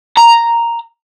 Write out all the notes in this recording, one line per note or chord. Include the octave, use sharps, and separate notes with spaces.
A#5